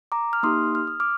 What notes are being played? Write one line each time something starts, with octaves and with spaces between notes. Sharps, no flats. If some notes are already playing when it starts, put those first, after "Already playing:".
A#5 D6
F6
A#3 D#4 G4 C6 D#6
F6
D#6
D6 F6